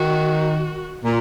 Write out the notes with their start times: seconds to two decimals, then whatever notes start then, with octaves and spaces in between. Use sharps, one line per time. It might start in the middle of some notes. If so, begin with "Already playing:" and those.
Already playing: D#3 F#4
1.03 A#2